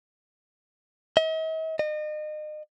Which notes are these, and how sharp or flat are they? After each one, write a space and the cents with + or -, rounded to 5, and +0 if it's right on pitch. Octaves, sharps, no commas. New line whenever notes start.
D#5 +45
D#5 -35